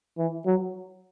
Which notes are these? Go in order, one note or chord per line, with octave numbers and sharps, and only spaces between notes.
E3
F#3